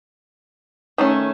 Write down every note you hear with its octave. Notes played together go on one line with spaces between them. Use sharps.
D#3 A3 C#4